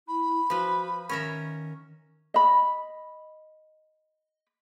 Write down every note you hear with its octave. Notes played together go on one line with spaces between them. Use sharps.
E4 B5
F3 F#4 B4
D#3 C#4 A#4 E5
D#5 B5